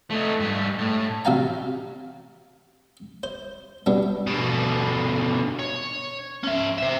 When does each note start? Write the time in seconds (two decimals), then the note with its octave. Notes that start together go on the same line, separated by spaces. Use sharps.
0.10 A3 D#4
0.40 G#2 G3
0.78 A2
1.25 A1 C3 F#4 F5 G#5 A#5
3.23 C5
3.86 G2 B2 B3 D4
4.27 B2 D3
5.59 C#5
6.44 C#4 E5
6.78 C5 E5